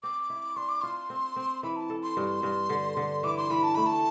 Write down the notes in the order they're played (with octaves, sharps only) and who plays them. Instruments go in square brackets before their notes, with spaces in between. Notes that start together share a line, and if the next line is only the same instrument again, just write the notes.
[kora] C4 [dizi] D6
[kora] E4
[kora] D4 [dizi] C6
[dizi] D6
[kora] F4 [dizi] C6
[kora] C4
C4
[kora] E3 [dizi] B5
[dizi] A5
[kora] A4
[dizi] C6
[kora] G2
G2
D3
D3
[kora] E3 [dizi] D6
[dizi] C6
[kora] E3 [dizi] B5
[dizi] A5
[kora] A3 [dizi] B5
[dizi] A5